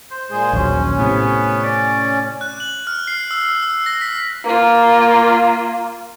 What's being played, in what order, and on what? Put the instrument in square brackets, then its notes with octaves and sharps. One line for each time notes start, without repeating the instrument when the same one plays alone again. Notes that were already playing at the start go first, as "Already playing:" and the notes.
[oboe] C5
[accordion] A#2 G#3 G#4
[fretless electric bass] A#1 D#2 F#3 [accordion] C#4
[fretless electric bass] A2 C3 [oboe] B3
[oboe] D5
[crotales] F#6
F#7
F6
C7
E6
E6
A#6
B6
[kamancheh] A#3 F4